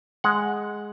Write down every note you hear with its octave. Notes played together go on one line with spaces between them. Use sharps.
G#3 F#5